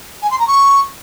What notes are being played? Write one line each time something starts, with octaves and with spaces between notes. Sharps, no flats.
G#5
C6
A#5
C#6